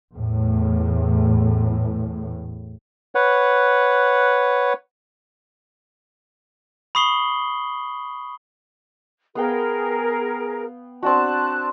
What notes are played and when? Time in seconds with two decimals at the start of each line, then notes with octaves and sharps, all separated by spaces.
0.14 E2 A2
3.15 B4 C#5 F#5
6.95 B5 C#6 D#6 C7 F#7 G7
9.35 B3 G#4 A#4 F5 G5
11.03 C4 D4 F#4 A5 F#6